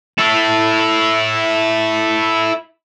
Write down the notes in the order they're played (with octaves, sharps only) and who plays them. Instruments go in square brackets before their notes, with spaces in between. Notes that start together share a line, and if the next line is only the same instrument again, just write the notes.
[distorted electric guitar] E4 A4